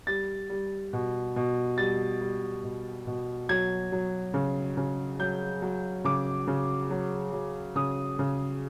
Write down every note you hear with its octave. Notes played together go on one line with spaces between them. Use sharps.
G3 A6
G3
B2
B2
G3 A6
G3
B2
B2
F#3 G#6
F#3
C#3
C#3
F#3 G6
F#3
C#3 D6
C#3
F#3
F#3
C#3 D#6
C#3